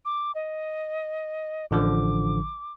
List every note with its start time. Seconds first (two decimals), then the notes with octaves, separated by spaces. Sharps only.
0.05 D6
0.35 D#5
1.71 A1 D3 F3 D6